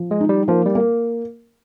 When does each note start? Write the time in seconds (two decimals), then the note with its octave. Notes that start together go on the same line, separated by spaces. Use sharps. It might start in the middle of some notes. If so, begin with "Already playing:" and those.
Already playing: F3
0.11 G#3
0.21 D#4
0.29 G3
0.48 F3 A#3
0.66 G3
0.75 A#3